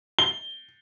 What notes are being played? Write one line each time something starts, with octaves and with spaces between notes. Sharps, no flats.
G7